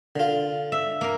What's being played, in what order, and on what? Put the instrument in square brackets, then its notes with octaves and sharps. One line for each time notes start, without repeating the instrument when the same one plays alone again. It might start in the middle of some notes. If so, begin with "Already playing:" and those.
[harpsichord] D3 F4
[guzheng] E5
A#3 A#4